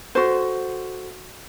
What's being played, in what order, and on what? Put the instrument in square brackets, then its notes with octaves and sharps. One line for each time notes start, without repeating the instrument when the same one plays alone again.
[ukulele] F#4 A4 C5